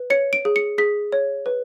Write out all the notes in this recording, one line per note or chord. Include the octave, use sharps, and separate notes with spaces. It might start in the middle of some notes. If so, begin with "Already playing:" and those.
Already playing: B4
C#5 C#7
D7
G#4
C#7
G#4 B6
C#5
B4